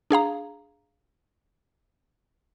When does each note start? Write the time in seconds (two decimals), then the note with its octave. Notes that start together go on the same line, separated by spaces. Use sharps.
0.11 D4 G#4 F5 A#5